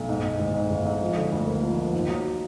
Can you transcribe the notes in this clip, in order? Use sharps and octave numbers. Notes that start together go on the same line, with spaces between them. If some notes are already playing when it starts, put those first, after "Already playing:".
Already playing: B1
G#2
G#2
G#1
G#2
G#1
G#2
F3
D3
D2
A#3
F3
F3
D#2
F#3